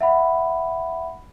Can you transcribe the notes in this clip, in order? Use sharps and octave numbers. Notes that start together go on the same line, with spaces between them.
E5 F#5 B5